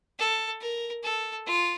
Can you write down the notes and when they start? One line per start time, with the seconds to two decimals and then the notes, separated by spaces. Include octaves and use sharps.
0.19 A4
0.61 A#4
1.04 A4
1.47 F4